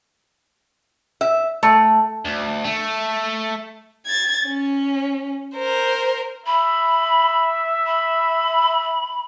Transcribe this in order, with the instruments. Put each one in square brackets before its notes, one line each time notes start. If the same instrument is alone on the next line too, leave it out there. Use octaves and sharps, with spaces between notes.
[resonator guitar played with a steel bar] E5
A3
[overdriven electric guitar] D2
A3
[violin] G#6 A6
C#4
A#4 C5
[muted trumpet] E5 [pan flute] B5
[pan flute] B5